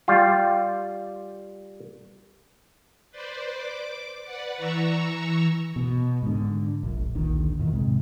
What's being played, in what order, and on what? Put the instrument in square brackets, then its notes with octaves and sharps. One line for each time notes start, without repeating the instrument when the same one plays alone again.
[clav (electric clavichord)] G3 F4
[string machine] B4 C5 D5
D6
B4 D5 F#5
E3 A#5 C#6 E6
[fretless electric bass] B2
G#2 D3
E1 A#1
D#1 A#1 D3 D#3
E2 A#2 D#3
G#2 C3 G#3